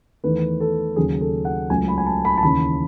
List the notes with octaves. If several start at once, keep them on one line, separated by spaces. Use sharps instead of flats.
E2 D#3 A3 B4
A4
D#2 C#3 F#3 G#4
A4
F#5
C#2 C#3 F#3 A3 G#5
B5
G#5
A5
B5
A5
D#2 C#3 E3 B5